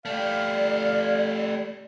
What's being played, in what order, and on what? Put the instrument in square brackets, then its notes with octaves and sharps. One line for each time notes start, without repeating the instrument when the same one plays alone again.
[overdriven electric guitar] A3 G4 [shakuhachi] D5 [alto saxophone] F5